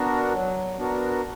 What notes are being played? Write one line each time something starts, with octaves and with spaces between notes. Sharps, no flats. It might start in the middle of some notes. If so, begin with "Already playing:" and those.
Already playing: B3 D4 F#4 A#4
F#3
B3 D4 F#4 A#4